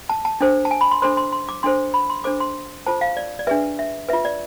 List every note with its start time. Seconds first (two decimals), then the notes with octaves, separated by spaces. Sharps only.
0.09 A5
0.25 A5
0.41 D4 A4 C5
0.65 A5
0.71 G#5
0.81 B5
0.91 C6
1.02 D4 A4 C5 C6
1.17 C6
1.32 C6
1.49 D6
1.63 D4 A4 C5 C6
1.94 B5
2.10 C6
2.24 D4 A4 C5 D6
2.40 C6
2.86 F4 A4 C5 A5
3.01 F5
3.17 D5
3.39 D5
3.47 D4 G#4 B4 E5
3.79 E5
4.09 F4 B4 E5
4.25 D5